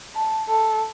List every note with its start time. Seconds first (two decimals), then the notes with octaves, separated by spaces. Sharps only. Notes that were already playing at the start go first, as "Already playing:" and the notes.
0.15 A5
0.48 A4